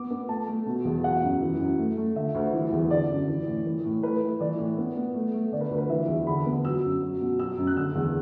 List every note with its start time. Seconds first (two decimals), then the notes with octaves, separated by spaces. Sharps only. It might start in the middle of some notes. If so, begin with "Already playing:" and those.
Already playing: B3 D6
0.10 B3
0.28 A3 A5
0.48 A3
0.66 B2
0.85 E2
1.04 F#3 F#5
1.22 F#2
1.41 E3
1.60 F#2
1.78 A3
1.97 A3
2.16 D3 E5
2.35 D2
2.53 E3
2.72 E2
2.90 D3 D5
3.09 F#2
3.28 E3
3.47 A2
3.65 E3
3.85 A2
4.03 A3 B4
4.21 A3
4.40 E3 D5
4.58 A2
4.77 B3
4.96 B3
5.14 A3
5.34 A3
5.52 D3 D5
5.61 B4
5.71 D2
5.78 B4
5.89 E3 E5
6.08 E2
6.27 D3 B5
6.46 B3
6.64 F#3 E6
6.83 F#2
7.02 F#3
7.21 B2
7.39 F#3 E6
7.58 F#2
7.67 F#6
7.76 D3 E6
7.95 E2